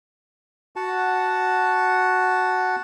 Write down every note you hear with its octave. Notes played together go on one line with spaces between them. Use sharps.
F#4 F#5 A5